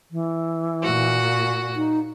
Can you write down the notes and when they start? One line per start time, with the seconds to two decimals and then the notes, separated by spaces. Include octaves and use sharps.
0.11 E3
0.83 A#2 F#4
1.76 D#4